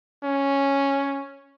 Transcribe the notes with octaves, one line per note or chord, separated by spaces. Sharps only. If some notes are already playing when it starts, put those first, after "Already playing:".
C#4